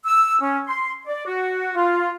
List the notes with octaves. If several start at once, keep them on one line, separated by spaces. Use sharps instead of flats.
E6
C#4
C6
D5
F#4
F4